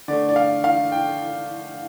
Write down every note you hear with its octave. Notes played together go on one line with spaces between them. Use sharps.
D3 A3 D5
D5
F5
F5
G5